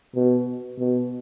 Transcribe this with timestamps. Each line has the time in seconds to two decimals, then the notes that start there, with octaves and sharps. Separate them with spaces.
0.15 B2
0.79 B2